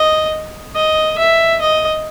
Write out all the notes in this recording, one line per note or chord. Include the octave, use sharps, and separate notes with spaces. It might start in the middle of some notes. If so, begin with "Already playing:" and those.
Already playing: D#5
D#5
E5
D#5